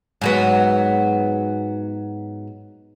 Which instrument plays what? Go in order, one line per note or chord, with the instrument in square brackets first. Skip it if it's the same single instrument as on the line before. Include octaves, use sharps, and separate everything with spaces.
[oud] G#2 F#3 B3